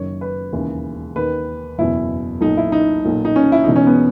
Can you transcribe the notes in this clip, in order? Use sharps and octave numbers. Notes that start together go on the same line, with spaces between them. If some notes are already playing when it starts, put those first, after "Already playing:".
Already playing: F#1 F#2 D#3 C#5
B4
E1 D#2 C#3 E3
D#2 D#3 B4
F#1 E2 B2 E4
B1 A#2 D#4
E4
D#4
B1 A#2
D#4
C#4
E4
E1 E2 B2 D#4
C#4
B3